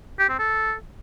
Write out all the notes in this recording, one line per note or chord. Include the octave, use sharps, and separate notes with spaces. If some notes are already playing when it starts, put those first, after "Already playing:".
G4
C4
A4